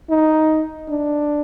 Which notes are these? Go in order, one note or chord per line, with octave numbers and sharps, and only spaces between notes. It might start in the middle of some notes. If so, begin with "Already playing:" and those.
D#4
D4